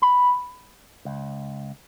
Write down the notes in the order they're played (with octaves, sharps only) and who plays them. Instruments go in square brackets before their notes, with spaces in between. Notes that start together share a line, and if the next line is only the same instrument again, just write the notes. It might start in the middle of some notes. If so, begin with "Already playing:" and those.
[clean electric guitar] B5
C#2